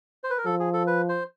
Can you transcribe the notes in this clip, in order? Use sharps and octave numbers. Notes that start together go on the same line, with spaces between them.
C5
B4
A#4
F3 A4
G#4
A4
B4
C5